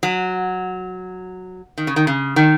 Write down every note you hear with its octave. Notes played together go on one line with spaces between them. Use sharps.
F#3
D#3
C#3
D#3
C#3
D#3